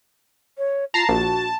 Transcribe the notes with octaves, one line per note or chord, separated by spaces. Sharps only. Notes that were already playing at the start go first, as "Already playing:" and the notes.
C#5
F4 A5 A#5 C7
A#1 F#4